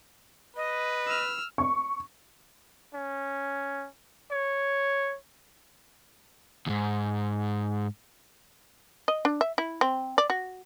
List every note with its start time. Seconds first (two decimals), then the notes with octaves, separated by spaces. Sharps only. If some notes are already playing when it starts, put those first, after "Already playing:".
0.57 B4 D#5
1.07 E6 F6
1.58 C#6
2.94 C#4
4.31 C#5
6.66 D#2 G#2
9.08 D#5
9.25 D4
9.41 E5
9.58 E4
9.81 C4
10.18 D5
10.30 F#4